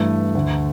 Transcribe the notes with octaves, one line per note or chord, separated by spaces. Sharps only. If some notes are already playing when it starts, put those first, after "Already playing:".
Already playing: G2 E3 A3
D2 D3